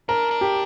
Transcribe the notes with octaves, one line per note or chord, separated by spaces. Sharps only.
D4 A#4
D4
G4